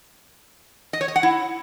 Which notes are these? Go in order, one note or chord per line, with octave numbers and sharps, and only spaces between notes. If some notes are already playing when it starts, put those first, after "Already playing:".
D#5
C#5
D#5
F#5
E4